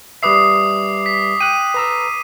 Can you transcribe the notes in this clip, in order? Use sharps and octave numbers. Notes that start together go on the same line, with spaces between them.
G3 B4 E5 D6 D#6 C7
B6
G5 F#6 D#7
B4 A#5 E6